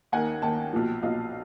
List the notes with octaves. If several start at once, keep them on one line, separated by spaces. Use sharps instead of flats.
D#2 D#3 F#5 G#5
D#2 D#3 G5 A5
B1 A#2 F3
B1 A#2 F3 D#5 F5